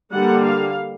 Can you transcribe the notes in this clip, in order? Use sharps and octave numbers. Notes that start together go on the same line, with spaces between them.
D3 G3 A#3 F#5
F5